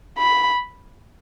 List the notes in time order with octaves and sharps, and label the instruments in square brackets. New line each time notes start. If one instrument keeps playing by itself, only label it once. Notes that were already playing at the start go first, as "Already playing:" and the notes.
[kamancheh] B5